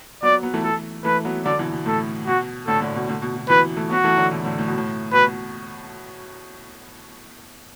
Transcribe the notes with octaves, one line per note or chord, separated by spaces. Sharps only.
F#3 B3 D5
F#3 B3
E3 A3
A4
E3 A3 B4
F#3 B3
D3 F#3 D5
B2 E3
B2
A2 A4
B2 F#4
A2 D3 A4
A2 D3
B2
A2 D3
B2
B2
B2 E3 B4
E3 A3
F#3 B3 F#4
E3 A3
D3 F#3
B2 E3
A2 D3
A2
B2
A2
B2 B4
B2